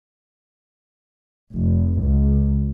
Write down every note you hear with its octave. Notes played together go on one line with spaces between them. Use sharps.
F1
C#2